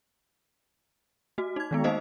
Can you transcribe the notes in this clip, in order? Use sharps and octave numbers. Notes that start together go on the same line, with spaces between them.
A3 F#4
D#4 G#6
D#3 G#3 B3
A#3 D#4 C5 D#5 F5